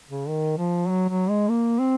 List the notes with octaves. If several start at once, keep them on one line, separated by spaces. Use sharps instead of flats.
C#3
D#3
F3
F#3
F#3
G#3
A#3
C4